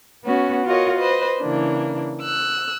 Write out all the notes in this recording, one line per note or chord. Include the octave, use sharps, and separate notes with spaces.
B3 C#4 F#4
F4 F#4 A#4 C#5 D#5
B4 C5 D#5
C#3 E3 A#3 D4
E6 F#6